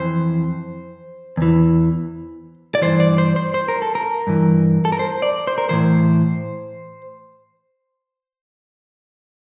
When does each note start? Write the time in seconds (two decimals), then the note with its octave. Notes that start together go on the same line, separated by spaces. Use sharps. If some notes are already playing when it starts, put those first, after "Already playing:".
Already playing: F2 E3 C5
1.37 E2 E3
2.75 D5
2.81 G2 E3 C5
3.00 D5
3.18 C5
3.36 C5
3.54 C5
3.68 A#4
3.82 A4
3.95 A#4
4.27 G2 E3
4.85 A4
4.92 A#4
4.99 C5
5.22 D5
5.47 C5
5.58 A#4
5.69 A2 E3 C5